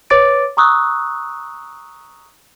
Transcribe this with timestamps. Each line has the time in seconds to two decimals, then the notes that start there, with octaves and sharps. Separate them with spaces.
0.10 B4 C#5 D6 A6 D7
0.57 A#5 C#6 D#6 E6 F#6